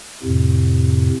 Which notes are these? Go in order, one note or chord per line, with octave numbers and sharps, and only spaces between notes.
F2 A2 C3